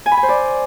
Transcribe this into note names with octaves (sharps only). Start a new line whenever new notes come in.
G#5
B5
G#5
C5
D5